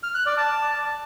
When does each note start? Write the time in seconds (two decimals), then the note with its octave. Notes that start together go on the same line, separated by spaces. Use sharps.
0.03 F6
0.15 F#6
0.26 D5
0.37 A5